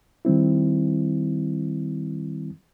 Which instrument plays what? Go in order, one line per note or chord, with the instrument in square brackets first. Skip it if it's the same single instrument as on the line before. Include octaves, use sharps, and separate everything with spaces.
[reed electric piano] D#3 G3 C4 E4